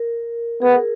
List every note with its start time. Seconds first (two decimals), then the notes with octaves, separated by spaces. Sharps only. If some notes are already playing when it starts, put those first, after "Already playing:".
Already playing: A#4
0.62 B3 G#4
0.72 A#4